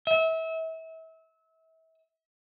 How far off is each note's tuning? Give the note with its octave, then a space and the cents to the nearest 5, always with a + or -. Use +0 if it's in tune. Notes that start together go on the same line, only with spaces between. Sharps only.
E5 -30